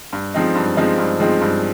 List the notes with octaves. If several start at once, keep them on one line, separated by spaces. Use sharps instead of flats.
G2
F3 G#3 C4 D#4
G2
F3 G#3 C4 D#4
G2
F3 G#3 C4 D#4
G2